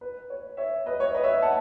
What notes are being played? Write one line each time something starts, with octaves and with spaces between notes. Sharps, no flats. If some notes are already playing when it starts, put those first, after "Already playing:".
B4
C#5
C#5 E5
B4 D#5
C#5
B4 D#5
C#5 E5
F#5 A5